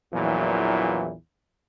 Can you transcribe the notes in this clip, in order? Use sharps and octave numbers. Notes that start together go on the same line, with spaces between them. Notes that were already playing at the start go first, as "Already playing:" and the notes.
A#1 E2 A#2 E3 F#3